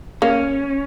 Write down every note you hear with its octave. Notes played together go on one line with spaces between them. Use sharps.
A#3 C#4